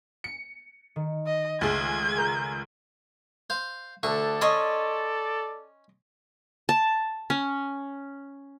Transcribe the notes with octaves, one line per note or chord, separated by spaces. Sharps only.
C#7
D#3
D#5
C#2 A3 G#4 G#6
A#4 A#5
C5 F5
D2 D3 A4 D5 C#6
C#4 D#5 C6 C#6
A5
C#4